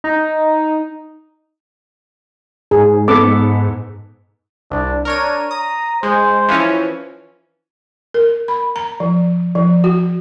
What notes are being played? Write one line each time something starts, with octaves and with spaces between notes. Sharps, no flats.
D#4
G#2 G#4
B3 A4 D6
C2 D4
D4 A#4 C#5 D#7
A#5 D#6
G#3 C5
E3 F3 C#4
A#4
B5
A#5
F3
F3
F#4